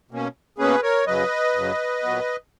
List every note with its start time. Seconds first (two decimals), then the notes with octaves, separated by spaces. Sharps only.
0.11 B2 A#3 C#4
0.58 B2 A#3 C#4 G#4 B4
0.82 A#4 C#5
1.07 F#2 C#3 F#3 B4 D#5
1.55 F#2 C#3 F#3
2.03 A#2 F#3 B3